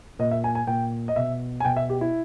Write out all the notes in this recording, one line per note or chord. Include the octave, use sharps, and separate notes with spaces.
A#2 D#5
E5
G#5
G#5
A#2 G5
D#5
B2 E5
G#5
B2 G5
E5
G4
E4